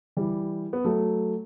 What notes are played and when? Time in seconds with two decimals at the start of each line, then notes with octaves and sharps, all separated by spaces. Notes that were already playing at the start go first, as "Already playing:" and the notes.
0.17 E3 G3
0.73 B3
0.84 F#3 A3